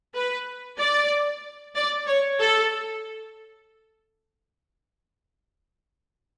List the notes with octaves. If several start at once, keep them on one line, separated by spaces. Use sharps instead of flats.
B4
D5
D5
C#5
A4